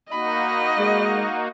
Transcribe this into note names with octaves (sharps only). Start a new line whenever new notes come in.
A#3 D#4 F#4 D#5 B5
G#3